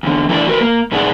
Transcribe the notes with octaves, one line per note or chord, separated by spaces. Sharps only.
E2 D3
E3 A3 D4 A#4 D5
F#4 A#4 B4
A#3
A#2 D#4 G#4 B4 D5 F#5